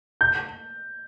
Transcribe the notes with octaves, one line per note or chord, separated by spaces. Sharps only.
G6